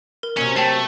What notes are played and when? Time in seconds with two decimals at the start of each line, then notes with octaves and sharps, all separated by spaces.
0.23 A#4
0.36 C3 F#3 A#3 C#4
0.56 A3 G5 A5 C7